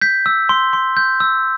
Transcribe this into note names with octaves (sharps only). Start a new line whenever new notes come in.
G6 B6
E6
C6
C6
G6
E6